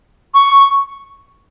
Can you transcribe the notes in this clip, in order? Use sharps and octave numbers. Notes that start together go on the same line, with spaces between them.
C#6